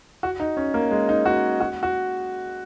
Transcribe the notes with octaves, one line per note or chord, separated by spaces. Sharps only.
F#4
D#4
C#4
A#3
G#3
D#4
F#4
F#4
F#4